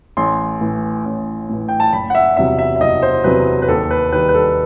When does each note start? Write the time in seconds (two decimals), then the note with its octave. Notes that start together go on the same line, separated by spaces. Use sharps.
0.17 A1 C6
0.61 A2 E3
1.05 A1
1.49 A2 E3
1.68 G5
1.80 A5
1.92 F#1 B5
2.10 F#5
2.15 E5
2.37 E2 C3 F#3 E5
2.59 E5
2.76 E5
2.80 F#1 D#5
3.02 C5
3.24 E2 C3 F#3 B4
3.62 B4
3.68 D#2 A4
3.91 B4
4.12 D#3 G3 B4
4.29 B4
4.34 A4